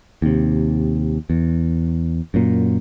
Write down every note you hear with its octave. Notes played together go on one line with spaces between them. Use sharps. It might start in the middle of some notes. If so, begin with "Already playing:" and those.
D#2 C3
E2
F#2 A#2